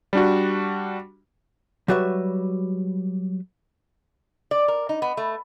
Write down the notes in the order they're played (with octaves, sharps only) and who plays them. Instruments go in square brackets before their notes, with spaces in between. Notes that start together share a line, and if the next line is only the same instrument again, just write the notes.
[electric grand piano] G3 D4 F#4
[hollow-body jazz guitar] F#3 G3 F#4 B4 E5
[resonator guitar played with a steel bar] D5
A#4
D#4
B3
A3